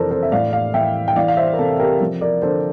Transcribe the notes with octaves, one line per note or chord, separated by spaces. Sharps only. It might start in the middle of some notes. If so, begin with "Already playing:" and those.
Already playing: F2 C3 E3 A4 A#4 C5 D5
A4 C5
E5
A2 D5 F5
D5 F5
E3 E5 G5
G5
E3 D5 F5
F5
C5 E5
A#4
C3 A4 C5
G4 A#4
F3
A#4 D5
D3 A4 C5